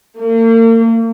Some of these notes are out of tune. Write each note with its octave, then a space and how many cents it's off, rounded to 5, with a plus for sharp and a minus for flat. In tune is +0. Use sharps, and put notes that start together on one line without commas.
A#3 -40